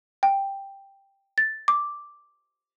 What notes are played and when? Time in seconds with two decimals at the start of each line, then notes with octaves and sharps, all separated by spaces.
0.23 G5
1.38 A6
1.68 D6